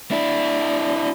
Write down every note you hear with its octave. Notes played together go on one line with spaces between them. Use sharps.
D4 E4